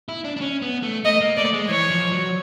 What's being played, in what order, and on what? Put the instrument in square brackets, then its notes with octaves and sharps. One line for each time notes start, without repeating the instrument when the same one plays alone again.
[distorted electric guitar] E4
D4
D4
C#4
B3
A3
[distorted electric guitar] A3 [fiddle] D#5
[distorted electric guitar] A#3
[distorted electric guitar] A3 [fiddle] D5
[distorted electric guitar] G#3
[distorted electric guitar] E3 [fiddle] C#5
[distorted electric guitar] F3
F#3